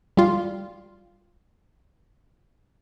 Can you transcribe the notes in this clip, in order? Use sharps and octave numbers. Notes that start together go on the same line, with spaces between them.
G3 F4